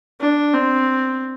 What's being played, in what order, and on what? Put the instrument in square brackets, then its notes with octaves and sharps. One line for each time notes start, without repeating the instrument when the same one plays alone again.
[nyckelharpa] D4
C4